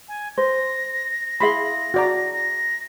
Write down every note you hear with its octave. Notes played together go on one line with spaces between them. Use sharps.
G#5
C5 A#6
E4 G#4 F5 B5 C6
F#4 D5 A#5
A#6